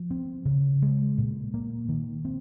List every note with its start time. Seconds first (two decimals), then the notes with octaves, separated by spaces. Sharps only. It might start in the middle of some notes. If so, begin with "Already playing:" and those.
Already playing: F3
0.11 C4
0.45 C#3
0.82 G#3
1.18 A#2
1.54 A#3
1.89 D#3
2.25 C4